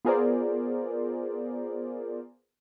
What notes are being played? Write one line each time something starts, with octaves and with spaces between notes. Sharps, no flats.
B3 F4 G#4 A#4 C5 D5